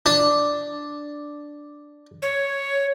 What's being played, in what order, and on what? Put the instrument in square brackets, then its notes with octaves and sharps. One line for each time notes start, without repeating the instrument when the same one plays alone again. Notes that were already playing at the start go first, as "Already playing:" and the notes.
[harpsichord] D4
[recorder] C#5